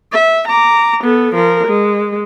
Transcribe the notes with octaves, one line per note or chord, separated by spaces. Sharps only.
E5
A#5 D6
B3 A4
F3 A#4
G#3